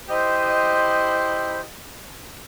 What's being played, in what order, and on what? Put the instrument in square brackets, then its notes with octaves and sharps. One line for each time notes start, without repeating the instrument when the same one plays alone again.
[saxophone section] E4 G4 D#5 [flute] C5